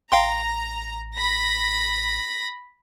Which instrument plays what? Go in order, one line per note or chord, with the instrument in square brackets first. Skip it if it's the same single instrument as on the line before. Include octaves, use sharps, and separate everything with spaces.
[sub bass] A1 [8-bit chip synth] F5 G5 C6 [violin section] A#5
[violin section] B5 A#6